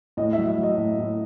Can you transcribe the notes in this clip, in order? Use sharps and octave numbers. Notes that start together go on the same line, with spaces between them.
A2 D#5
E5
F#3
E5
F#3
D#5
A2
A2